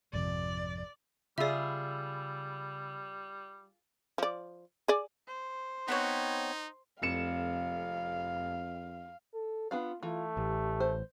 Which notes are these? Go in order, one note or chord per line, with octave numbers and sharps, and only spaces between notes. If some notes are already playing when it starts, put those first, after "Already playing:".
G#1 F2 C3 D5
C#3 G3 F4 G#4 D5 E5 B5 E6
F3 D5
G#4 D5
C5
B3 C4 D#4 C#5
F1 F2 F5 C#7 E7
A4
B3 D4 F4 F5
E3 A3 F4
A1 G4
C5